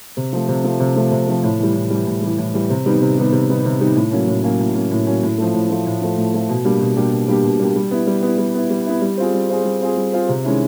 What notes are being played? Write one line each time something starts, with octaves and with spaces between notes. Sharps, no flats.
C3
F3 A3
C3
F3 A3
C3
F3 A3
C3
F3 A3
A2
E3 G3
A2
E3 G3
A2
E3 G3
A2
E3 G3
C3
D#3 G3 B3 D#4
C3
D#3 G3 B3 D#4
C3
D#3 G3 B3 D#4
C3
D#3 G3 B3 D#4
A2
F#3 A#3 C#4
A2
F#3 A#3 C#4
A2
F#3 A#3 C#4
A2
F#3 A#3 C#4
A2
F3 A3
A2
F3 A3
A2
F3 A3
A2
F3 A3
B2
G3 A#3 D4 G4
B2
G3 A#3 D4 G4
B2
G3 A#3 D4 G4
B2
G3 A#3 D4 G4
G3
B3 E4
G3
B3 E4
G3
B3 E4
G3
B3 E4
G3
C4 F4 G#4
G3
C4 F4 G#4
G3
C4 F4 G#4
G3
C4 F4 G#4
C3
D#3 G#3 C#4 E4